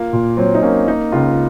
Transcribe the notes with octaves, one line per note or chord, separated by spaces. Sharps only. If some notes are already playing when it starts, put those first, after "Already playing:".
Already playing: A#3 F4
A#2
F#3 C4
D#4
A#3 C#4
A#3 D#4
C#2 F4